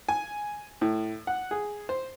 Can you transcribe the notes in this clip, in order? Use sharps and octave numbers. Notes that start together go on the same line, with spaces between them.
G#5
A2
F#5
G#4
C5